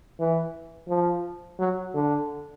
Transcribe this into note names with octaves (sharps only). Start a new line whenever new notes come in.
E3
F3
F#3
D3